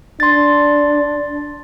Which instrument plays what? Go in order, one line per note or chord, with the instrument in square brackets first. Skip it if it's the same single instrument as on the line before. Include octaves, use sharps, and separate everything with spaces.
[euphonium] D4 [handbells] C6 A6